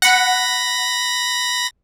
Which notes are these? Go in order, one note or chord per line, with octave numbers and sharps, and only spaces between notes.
F#5 B5 A#6